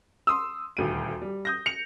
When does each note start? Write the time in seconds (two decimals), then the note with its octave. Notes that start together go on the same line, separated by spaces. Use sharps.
0.27 C6 D#6 E6
0.77 D#1 D2 D#7
1.22 G3
1.45 D#6 G6 A#6
1.66 C#7 F7